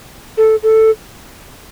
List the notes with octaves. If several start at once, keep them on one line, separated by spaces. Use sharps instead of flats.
A4
A4